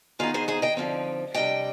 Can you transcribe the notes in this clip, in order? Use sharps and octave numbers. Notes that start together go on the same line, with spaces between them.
D#3 B3 D#4 F4 G#4
G#4 C5
G#4 C5
D#5 G5
D3 F3 C4 D#4
C3 G3 D4 D#5 G5